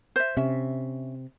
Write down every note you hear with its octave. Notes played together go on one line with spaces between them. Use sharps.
C5 E5
C3 C#4 E5